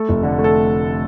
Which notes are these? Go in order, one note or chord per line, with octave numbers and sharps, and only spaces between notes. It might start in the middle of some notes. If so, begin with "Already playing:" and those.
Already playing: A3 A4
F1
D3
A3
A4